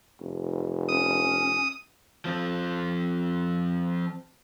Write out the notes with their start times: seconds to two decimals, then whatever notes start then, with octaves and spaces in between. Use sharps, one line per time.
0.20 F1
0.89 C#4 D#6
2.25 F3 C4